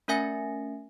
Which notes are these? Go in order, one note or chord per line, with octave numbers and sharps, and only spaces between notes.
A3 C#4 A#4 E5 G#5 A#6